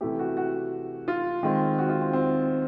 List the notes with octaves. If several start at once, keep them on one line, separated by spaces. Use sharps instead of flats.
C3 E3 A3 G4
F#4
F#4
F4
D#3 G#3 C4
F#4
F4
C4
C4